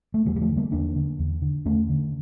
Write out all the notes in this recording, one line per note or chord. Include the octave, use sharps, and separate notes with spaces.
A3
E2 E3 G3
G3
F3 A3
D3
G3 A#3
E2 A#3 D4
D3
E2
D3
E2 A3 C#4
D3